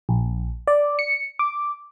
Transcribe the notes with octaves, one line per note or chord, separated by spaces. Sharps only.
A#1
D5
C#7
D6